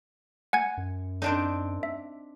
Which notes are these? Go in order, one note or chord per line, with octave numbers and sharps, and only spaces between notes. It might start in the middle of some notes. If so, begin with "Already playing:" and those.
F#5 G#5 G#6
F#2
C4 D4 D#4
E5